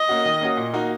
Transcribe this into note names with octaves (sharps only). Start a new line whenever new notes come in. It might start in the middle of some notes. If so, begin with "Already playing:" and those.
Already playing: D#5
A#3 C#4 F#4
D#3
A#3 C#4 F#4
A#2
A#3 D#4 F#4